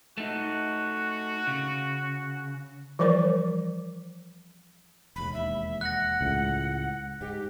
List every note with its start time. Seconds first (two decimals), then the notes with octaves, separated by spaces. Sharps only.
0.18 A3 D#4 F#4
1.47 C#3
2.99 E3 F3 G3 A#4 C5 D6
5.16 E1 D#2 B5
5.34 E5
5.81 F#5 F#6 A#6
6.21 C#2 A2
7.21 G#2 G4